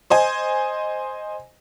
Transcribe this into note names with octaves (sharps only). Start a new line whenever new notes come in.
C5 D#5 G#5